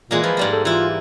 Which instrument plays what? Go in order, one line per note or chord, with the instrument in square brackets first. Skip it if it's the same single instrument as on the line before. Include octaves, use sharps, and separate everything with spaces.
[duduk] A#2 [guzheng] E3 G#3 A#3
[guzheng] F3 [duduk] B4
[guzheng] G#2 G3 A#3
[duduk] A4
[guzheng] E3 E4 [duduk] F4